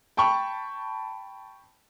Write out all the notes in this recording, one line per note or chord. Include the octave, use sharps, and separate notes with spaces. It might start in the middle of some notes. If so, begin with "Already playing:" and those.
G5 A5 B5 C#6